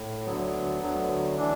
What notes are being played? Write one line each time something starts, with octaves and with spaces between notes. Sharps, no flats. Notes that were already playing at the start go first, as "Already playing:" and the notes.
Already playing: A2
D2 D3 F#3 B3
D2 D3 F#3
E3 D4